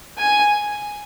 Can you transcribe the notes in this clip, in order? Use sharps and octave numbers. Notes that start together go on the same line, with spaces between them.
G#5